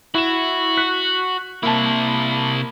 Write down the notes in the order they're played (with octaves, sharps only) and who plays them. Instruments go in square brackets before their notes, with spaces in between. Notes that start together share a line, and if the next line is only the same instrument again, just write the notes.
[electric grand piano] E4 E7 [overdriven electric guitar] F#4
[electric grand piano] F#6 B6 C#7
[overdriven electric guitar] C3 E4 [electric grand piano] A#3 A5